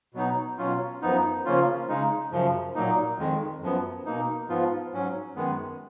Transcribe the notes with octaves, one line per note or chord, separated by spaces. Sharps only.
B2 F#3 B3 D#4
B2 F#3 C#4 F4
F#2 F3 B3 D#4
C#3 F3 A#3 C#4 F4
C#3 G#3 D#4
F#2 C#3 F3
A#2 F#3 A#3 D#4
F2 D#3 G#3
F#2 F3 B3
B2 A#3 D#4
G#2 F3 B3 F4
G#2 F#3 C#4
F#2 D#3 G#3 B3